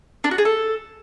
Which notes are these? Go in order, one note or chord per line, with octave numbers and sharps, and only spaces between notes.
D4
F#4
G#4
A4